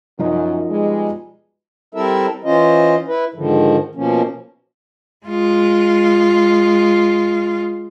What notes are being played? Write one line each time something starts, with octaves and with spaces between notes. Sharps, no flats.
F#2 F3 D#4
B2 G3 G#3
G3 C4 E4 A4 A#4 E5
E3 C#4 F4 C5 D#5
E4 B4
G#2 D3 D#3 F3
B2 F3 A#3 C#4
G#3 F4